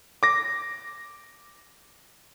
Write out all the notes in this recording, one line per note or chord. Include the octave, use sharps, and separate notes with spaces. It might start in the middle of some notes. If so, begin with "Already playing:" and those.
D6 A#6